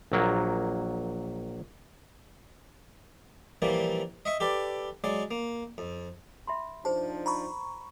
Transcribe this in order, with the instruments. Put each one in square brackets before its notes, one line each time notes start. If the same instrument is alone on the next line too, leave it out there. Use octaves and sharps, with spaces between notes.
[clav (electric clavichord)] A#1 F#3 A#3
[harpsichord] A#2 E3 F3 G3 A#3
D#5 E5 C#6
G4 A4 B4 D5
F#3 G#3 D5
A#3
F2
[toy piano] E5 B5 C6
[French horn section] F3 D4 D#4 [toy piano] G#4 C5 [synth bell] A5
[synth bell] A#5 B5 C#6